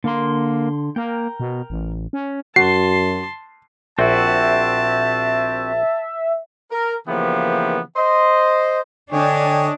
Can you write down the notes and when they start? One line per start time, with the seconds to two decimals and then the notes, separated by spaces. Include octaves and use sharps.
0.04 D3 A#3 C6
0.96 A#3 A#4 G5
1.40 B2
1.70 A1
2.13 C#4
2.56 F#2 F#4 A5 C6 C7
3.99 A#1 C4 F#4 E5 A5
6.72 A#4
7.08 C#3 E3 F3 A#3 B3 G4
7.96 C5 D#5
9.12 D3 D4 C#5 D#5 G5 G#5